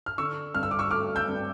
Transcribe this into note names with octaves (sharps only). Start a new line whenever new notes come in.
F6
D3 C#6 E6
G2 F6
E6
D6
C#6 E6
A3 D6 F6
E6 G6
G2